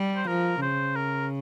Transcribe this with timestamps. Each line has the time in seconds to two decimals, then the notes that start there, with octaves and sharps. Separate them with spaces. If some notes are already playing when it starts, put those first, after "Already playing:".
Already playing: G3
0.16 C5
0.27 F3 A#4
0.62 C#3 C5
0.96 A#4